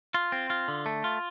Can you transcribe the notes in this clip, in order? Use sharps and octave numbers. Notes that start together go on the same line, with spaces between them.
F4
C4
F4
D3
A3
F4